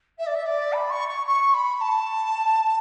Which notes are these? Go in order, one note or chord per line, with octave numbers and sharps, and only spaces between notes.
E5
D5
E5
D5
B5
C#6
C#6
C#6
B5
A5